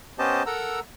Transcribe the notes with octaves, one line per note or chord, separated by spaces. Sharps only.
B3 C#4 G4 C5 D#5 A5
A4 A#4 F#5 A#5 E6